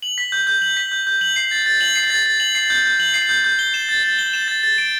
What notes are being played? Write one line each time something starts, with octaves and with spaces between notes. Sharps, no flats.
F#7
B6
G6
G6
F#7
B6
G6
G6
F#7
C7
A6
A6
F#7
C7
A6
A6
F#7
C7
G6
G6
F#7
C7
G6
G6
G7
E7
A6
A6
G7
E7
A6
A6
D7